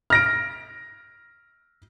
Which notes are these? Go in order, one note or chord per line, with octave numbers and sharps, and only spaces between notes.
F6 A#6 D7